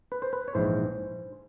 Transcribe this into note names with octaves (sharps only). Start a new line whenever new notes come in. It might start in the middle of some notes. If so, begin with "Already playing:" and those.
B4
C5
B4
C#5
A#1 G#2 E3 C5